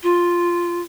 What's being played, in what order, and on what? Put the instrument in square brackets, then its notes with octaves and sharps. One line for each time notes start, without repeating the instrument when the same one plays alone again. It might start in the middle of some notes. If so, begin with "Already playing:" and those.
[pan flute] F4